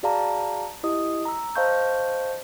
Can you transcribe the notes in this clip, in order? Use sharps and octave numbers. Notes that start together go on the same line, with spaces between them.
F#4 G#4 D5 F5 A5 A#5
E4 G4 D#5 D#6
A#5 E6
C5 D#5 F5 A5 C#6 G6